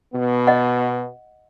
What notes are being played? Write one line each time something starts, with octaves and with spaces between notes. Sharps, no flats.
B2 B3
D#5 F#5